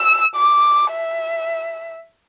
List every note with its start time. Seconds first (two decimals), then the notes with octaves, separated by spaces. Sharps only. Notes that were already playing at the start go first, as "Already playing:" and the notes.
Already playing: E6
0.36 D6
0.91 E5